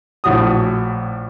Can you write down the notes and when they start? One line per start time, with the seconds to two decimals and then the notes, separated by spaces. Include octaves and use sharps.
0.24 A#1 A2 F#4 D#6